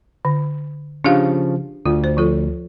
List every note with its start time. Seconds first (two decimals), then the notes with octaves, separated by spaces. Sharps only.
0.25 D3
1.04 C#3 F3 D4 G4 F5
1.86 D2 F4
2.04 C5
2.17 F3 F4 A4